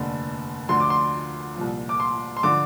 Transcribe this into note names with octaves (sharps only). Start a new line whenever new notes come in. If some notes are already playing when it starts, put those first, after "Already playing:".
Already playing: F1 D#2 D3
D2 D3 F3 C6
D6
C6
C2 A#2 F3
D6
C6
C6
D3 F3 D6